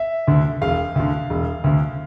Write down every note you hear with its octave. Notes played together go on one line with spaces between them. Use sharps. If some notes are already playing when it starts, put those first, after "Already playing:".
Already playing: E5
D2 D3
E1 F5
D2 D3
E1
D2 D3